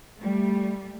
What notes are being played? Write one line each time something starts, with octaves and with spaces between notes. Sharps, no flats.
G3 A3